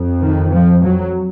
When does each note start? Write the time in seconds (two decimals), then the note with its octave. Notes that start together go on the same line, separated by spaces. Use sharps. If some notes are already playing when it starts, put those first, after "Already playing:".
Already playing: F2
0.21 D#3
0.51 F3
0.82 F#3